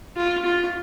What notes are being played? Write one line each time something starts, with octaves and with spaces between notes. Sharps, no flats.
F4
F4